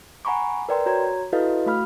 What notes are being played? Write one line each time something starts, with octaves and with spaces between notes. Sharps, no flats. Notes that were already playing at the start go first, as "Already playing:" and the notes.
F#5 G#5 A#5 B5 C#6 D6
A#4 B4 D5 G5 A#5 C6
F#4 C#5 A#5 G#6
E4 F#4 A4 B4 D#5 F5
A3 F#4 F5 B5 F6